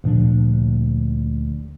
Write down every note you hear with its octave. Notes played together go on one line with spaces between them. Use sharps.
D2 A#2 F3 D4